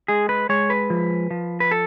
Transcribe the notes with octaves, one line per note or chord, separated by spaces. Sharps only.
G#3 G#4
B4
G#3 C#5
B4
F3
F3
B4
A4